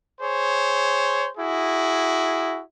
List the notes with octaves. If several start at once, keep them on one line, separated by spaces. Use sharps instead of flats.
G#4 C5 C#5
E4 F#4 G#4